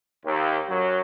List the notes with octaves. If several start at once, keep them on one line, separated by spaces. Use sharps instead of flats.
D#2
F#2 F#3